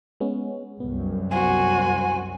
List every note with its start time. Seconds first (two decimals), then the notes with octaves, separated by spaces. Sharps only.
0.20 G#3 B3 C#4
0.80 C2 F#2 B3
1.31 F#4 C5 G#5